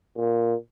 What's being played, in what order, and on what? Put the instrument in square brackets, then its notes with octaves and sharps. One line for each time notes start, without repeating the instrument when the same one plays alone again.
[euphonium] A#2